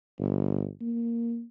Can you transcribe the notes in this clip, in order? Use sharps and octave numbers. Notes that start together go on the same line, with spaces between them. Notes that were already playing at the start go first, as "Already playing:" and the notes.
G1
A#3